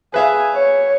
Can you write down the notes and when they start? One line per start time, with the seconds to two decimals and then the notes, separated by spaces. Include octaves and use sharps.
0.14 G#4 B4 E5 F5
0.54 C#5